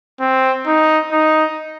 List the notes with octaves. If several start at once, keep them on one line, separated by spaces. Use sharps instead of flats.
C4
D#4
D#4